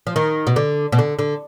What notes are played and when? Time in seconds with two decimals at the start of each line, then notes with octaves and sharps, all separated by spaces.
0.07 F3
0.16 D#3
0.47 B2
0.56 D3
0.92 B2
0.99 D3
1.19 D3